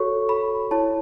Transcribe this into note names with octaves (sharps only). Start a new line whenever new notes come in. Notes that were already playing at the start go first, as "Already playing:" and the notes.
Already playing: F#4 A4 C#5 C#6
B5
E4 C#5 A5